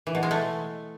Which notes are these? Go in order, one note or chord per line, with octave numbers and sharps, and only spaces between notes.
E3
B2
G#3
A3